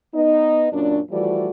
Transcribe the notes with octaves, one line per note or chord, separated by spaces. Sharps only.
B3 D#4 D#5
F#2 A#2 C#4 D4
E3 F3 G3 A3 F#4 D5